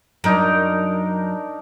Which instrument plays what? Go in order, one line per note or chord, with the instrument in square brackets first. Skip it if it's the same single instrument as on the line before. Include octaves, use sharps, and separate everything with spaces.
[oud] F#2 [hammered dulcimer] D4 D#4 A#4